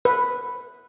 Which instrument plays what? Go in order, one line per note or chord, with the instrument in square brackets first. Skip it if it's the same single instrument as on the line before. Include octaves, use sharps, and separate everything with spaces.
[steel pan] B4